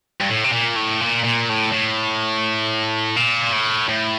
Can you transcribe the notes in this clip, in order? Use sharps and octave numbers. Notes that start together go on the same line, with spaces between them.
G2
A2
C3
A#2
A2
A#2
A#2
A2
A2
A#2
A2
A2